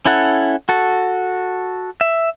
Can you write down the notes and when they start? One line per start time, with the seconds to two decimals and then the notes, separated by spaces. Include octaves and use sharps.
0.05 C#4 E4 A4 F#5
0.69 F#4 A4
2.01 E5